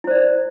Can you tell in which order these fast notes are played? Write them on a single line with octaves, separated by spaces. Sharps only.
E4 C5 D5